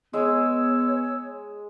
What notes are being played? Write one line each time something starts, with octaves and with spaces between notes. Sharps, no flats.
G#3 B3 C#5 E6